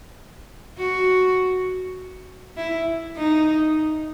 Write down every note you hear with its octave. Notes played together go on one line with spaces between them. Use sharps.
F#4
E4
D#4